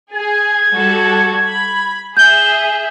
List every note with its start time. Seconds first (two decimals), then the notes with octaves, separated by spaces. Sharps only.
0.14 G#4 G#6
0.73 G3 F#4 A4
1.47 B5
2.17 G#4 E5 G6 G7